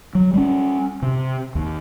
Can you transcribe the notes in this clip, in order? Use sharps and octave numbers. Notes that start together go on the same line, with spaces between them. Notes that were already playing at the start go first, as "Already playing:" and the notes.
F#3
G3 G#3 C#4
C3
D#2